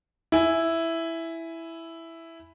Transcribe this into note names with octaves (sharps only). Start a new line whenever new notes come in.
E4 G#5